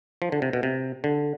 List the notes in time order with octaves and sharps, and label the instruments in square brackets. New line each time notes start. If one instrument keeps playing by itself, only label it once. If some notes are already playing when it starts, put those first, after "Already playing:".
[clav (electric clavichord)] F3
D3
C3
B2
C3
D3